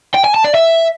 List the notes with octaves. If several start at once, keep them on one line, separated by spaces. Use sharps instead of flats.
G5
G#5
A5
D5
E5